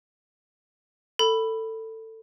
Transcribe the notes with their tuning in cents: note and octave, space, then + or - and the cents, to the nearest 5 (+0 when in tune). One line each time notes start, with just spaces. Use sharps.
A4 +20 B5 +0